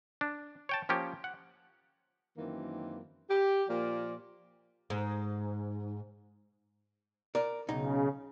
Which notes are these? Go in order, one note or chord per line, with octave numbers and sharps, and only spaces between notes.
D4
C#5 G5 A5
F3 A#3 C#4 G4
F#5
F#2 D#3 E3 A#3 C4
G4
A#2 F3 A#3 D5
G#2
A#4 D5
B1 C#3 D#4